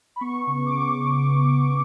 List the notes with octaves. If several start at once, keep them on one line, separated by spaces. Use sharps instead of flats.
B5
B3 C#6
C#3
D6
C#3 C#6